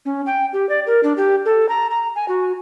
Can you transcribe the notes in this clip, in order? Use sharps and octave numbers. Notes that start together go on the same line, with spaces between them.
C#4
G5
G4
D5
A#4
D4
G4
A4
A#5
A#5
G#5
F#4